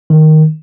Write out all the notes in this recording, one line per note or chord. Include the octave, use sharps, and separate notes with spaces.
D#3